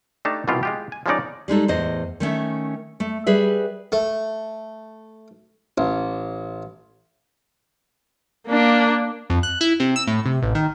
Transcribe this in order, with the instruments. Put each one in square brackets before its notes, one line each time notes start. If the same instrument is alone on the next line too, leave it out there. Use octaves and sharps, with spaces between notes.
[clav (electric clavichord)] A3 D4 D#4 G4 A5
C2 B2 E3 B3 F4 G4
G#3 F4 G4
G#5
F3 G3 G#3 C#4 D#4 D5
[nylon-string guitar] G3 G#3 D#4 A4
E2 A2 C5 D#5
D#3 A3 C#4 E5
A3
G3 G#4 B4 E5
[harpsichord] A3
A1
[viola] A#3 D4
[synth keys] F2
F#6
E4
C3
E6
A2
C3
A1
D#3